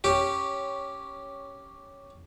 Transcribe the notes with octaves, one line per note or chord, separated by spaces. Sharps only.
C#4 G4